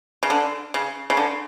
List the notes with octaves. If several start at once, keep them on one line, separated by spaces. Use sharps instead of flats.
C#3
D3
C#3
C#3
D3